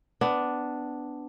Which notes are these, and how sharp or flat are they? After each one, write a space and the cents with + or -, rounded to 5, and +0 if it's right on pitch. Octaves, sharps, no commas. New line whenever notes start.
B3 +15 D4 +0